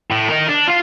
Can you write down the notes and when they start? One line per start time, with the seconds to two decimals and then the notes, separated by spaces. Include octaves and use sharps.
0.12 A2
0.29 D#4 A#4
0.49 D4
0.68 F4 F5